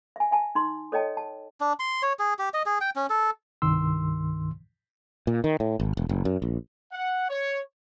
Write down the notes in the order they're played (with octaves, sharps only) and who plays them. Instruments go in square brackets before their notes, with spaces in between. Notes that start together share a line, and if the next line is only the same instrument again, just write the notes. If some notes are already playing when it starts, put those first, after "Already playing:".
[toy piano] E5 G#5
E5 G#5 A5
D#4 C6
A4 C#5 D#5 G5 A5
A5
[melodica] D4
C6
C#5
G#4
G4
D#5
G#4
G5
C#4
A4
[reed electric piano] C2 G2 D#3 C6 E6
[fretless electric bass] A#2
D#3
A2
G#1
E1
F#1
F#2
A#1
[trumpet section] F#5
C#5